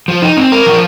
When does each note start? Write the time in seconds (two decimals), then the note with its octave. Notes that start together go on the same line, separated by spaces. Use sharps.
0.08 F3
0.22 D#4
0.37 C4
0.52 A#4
0.66 F3